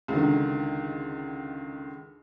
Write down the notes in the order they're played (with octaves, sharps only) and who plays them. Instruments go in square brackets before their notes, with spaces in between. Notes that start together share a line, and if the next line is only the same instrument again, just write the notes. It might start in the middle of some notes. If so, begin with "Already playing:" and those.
[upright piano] C#2 D3 D#3